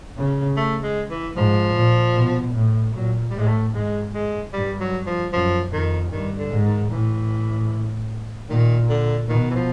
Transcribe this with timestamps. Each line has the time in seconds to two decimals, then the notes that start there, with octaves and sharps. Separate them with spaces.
0.17 C#3
0.57 A3
0.83 G#3
1.10 E3
1.36 G#2 F3
1.75 A#2
2.15 B2
2.55 A2
2.94 A#2 F#3
3.30 G3
3.34 A2
3.39 G#3
3.47 A3
3.74 G#2 G#3
4.14 G#3
4.53 G2 G3
4.80 F#3
5.07 F3
5.32 F#2 F3
5.72 F2 D#3
6.12 G2 D#3
6.38 D3
6.51 G#2
6.65 D#3
6.91 A2 E3
8.49 A#2 D#3
8.89 D3
9.28 B2 D#3
9.51 E3
9.55 F3